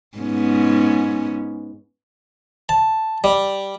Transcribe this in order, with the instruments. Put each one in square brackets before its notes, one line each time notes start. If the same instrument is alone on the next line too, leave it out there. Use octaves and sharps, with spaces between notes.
[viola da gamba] G#2 B3 C#4
[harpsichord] A5
G3